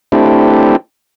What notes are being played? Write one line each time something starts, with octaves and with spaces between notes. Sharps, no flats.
A3 C4 D4 E4 G4